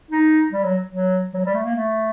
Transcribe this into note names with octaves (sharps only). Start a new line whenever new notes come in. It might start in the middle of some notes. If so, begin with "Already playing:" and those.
D#4
G3
F#3
F#3
F#3
G3
A3
A#3
A3